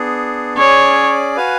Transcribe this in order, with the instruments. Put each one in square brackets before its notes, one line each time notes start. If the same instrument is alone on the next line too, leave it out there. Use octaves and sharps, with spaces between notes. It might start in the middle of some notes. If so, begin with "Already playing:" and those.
Already playing: [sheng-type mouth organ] B3 D4 G#4
[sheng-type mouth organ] C#4 G#4 D5 [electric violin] C#5
[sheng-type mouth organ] F#4 B4 F5 G#5